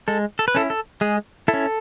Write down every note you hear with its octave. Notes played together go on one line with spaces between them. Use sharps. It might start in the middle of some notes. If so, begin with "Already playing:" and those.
G#3 A4
A4
B4
C#4 E4 A4
A4
G#3 G#4
E4 A4
C#4